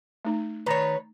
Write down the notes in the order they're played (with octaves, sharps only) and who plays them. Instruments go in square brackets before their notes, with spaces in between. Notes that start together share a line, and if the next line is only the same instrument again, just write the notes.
[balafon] A3 D#4
[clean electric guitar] D#3 A#5 [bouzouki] B4 C#5